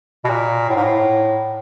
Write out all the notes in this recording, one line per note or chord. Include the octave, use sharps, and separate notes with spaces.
B2
A#2
A2
G#2
A2